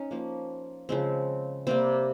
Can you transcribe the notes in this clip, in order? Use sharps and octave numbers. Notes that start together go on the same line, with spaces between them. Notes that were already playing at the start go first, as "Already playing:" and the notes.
Already playing: C#4 D#4
F3 A#3
C#3 F3 G#3 C4
C3 G3 A#3 C4